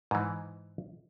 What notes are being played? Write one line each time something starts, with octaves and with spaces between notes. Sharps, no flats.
G#2 E3